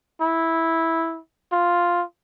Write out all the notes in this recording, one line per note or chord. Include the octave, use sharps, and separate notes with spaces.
E4
F4